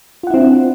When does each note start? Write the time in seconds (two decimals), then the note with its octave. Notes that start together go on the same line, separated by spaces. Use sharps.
0.23 F4
0.27 F#5
0.30 E4
0.34 C4
0.37 D4